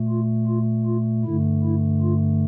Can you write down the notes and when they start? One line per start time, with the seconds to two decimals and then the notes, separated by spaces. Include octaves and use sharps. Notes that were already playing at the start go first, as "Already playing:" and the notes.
Already playing: A#2 A3
0.09 F4
0.47 F4
0.86 F4
1.25 G2 D3 A3 E4
1.63 E4
2.02 F4